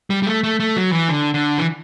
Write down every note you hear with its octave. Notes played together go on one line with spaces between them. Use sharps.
G3
G3
A3
A3
A3
F#3
E3
D3
D3
E3